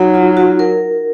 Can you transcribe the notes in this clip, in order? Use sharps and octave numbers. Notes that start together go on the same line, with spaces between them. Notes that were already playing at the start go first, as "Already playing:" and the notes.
Already playing: F#3 D#4
F4
F#4
A#4